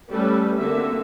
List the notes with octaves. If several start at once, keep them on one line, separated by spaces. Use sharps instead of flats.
G3 A3 C#4 A4 B4
D3 A#3 C4 F#4 E5